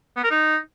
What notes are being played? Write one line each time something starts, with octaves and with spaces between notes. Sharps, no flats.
B3
A#4
D#4